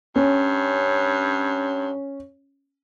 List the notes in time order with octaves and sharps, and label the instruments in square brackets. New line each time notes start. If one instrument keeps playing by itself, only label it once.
[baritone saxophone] G2 [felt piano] C#4